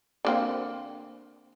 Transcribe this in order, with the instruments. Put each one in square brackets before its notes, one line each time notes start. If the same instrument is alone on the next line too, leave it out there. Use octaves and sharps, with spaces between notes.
[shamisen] D3 A#3 C4